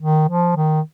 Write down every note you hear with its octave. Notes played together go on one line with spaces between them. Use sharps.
D#3
F3
D#3